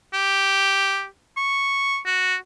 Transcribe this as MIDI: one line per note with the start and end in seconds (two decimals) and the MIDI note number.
0.13 1.06 67
1.37 1.98 85
2.06 2.36 66